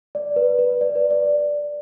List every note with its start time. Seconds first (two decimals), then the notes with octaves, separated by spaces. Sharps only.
0.15 D5
0.36 B4
0.59 B4
0.81 D5
0.95 B4
1.11 D5